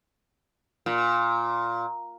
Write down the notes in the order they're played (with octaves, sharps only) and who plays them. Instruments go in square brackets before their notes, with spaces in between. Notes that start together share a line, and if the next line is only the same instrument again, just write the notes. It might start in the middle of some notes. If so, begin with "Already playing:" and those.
[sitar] A#2